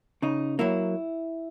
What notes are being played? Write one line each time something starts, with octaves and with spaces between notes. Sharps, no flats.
C#3 D#4
F#3 A#3 E4